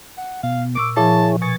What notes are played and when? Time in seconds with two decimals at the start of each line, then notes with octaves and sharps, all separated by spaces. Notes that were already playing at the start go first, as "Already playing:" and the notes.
0.18 F#5
0.43 B2 F5
0.75 A#2 C#6 D6 E6
0.97 A#2 F3 E4 G#4 C#5 A5
1.42 B2 G#5 C#6 A6